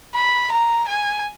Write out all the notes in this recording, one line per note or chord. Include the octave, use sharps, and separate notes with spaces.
B5
A#5
G#5